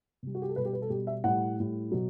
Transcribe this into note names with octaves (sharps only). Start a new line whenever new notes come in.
C3 G3
F#4
G4
A4
B2 G3 B4
G4
B4
A4
B2 G3 G4
E5
A2 G3 F#5
A2 G3
B2 F#3